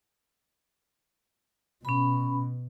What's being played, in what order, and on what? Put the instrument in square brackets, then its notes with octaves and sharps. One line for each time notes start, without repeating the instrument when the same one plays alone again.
[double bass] B2 [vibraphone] C#4 B5